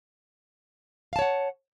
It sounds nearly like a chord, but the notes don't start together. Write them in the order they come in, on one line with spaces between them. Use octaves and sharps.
F5 A5 C#5 F#5